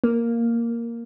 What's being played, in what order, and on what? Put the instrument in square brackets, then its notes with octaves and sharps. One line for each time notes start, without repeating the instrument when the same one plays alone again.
[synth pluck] A#3